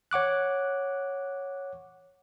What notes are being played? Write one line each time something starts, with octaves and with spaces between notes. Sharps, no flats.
C#5 F#5 D6 F#6